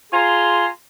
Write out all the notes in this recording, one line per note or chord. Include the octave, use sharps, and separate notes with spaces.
F4 G#4 G#5 A#5 C6